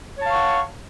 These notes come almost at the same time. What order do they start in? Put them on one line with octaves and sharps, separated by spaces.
C#5 A5 F5 C#6 F#5